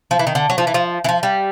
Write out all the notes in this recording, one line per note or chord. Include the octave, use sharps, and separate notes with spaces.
F3
E3
D#3
D3
F#3
F3
E3
F3
E3
F3
G3